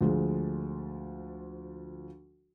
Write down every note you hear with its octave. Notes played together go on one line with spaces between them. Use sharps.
D2 F3 G#3